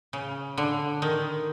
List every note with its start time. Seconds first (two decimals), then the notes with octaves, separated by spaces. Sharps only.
0.13 C#3
0.58 D3
1.02 D#3